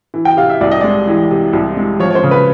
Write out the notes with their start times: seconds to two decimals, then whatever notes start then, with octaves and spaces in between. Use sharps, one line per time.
0.14 E3
0.25 G5
0.37 C3 F5
0.50 E5
0.61 C2 D5
0.71 D#5
0.81 G#3 D5
1.07 E3
1.31 C3
1.53 C2
1.77 G#3
2.00 F3 C#5
2.11 C#5
2.15 C5
2.23 C#3
2.31 B4